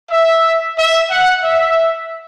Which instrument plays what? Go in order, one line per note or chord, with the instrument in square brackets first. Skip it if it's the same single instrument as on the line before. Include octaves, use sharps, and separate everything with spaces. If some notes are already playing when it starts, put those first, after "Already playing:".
[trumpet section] E5
E5
F#5
E5